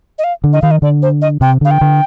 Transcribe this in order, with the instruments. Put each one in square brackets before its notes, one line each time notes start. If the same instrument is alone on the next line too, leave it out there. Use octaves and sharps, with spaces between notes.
[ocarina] D#5
F5
[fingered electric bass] D3
[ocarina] D#5
[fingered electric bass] D#3 [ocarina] F5
[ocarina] D#5
[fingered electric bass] D3 [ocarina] D5
[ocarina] C5
D#5
[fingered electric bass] C3 [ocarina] G5
[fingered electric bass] D3 [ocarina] F5
[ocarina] G5
[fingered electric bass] D3